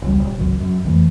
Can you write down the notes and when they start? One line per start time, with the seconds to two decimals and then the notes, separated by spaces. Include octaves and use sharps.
0.02 E1 C#2 G3
0.19 D#1
0.38 G#1 C#2 F#2
0.60 F#2
0.85 F2 E3 A3